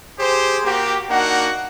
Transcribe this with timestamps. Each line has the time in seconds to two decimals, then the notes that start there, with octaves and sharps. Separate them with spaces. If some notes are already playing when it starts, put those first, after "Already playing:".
0.19 G4 G#4 C5
0.65 A#3 F#4 G4
1.08 A#3 D4 D#4 F#4 F#5